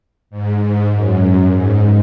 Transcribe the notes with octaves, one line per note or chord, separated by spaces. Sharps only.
G#2
G#2
F#2
G#2